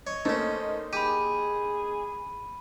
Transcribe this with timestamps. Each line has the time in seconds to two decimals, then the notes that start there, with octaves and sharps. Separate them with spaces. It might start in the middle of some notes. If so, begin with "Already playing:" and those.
0.07 C#5 D#5
0.25 A3 A#3 C#4 D#4 C5
0.93 G4 G#4 B5 D#7